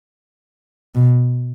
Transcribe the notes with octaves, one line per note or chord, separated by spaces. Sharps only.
B2